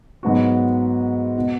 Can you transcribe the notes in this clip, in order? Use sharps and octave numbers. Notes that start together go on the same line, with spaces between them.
G#2 F#3 B3 F#4
B2